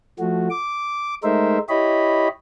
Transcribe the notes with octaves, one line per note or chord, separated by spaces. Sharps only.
F3 A3 F#4
D6
G#3 A3 D#4 A#4 C5 E5
E4 G4 C#5 D#5 B5